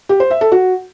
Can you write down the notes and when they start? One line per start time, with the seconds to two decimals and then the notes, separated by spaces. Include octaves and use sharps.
0.09 G4
0.20 C5
0.31 E5
0.41 A4
0.52 F#4